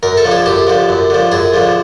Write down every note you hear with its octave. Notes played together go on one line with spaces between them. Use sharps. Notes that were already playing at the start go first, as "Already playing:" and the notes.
F#2 A#4
A4
D3 F3
G#4
F#2 G4
D3 F3
F#2
D3 F3
F#2 G#4
D3 F3